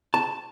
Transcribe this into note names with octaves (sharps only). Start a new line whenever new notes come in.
A5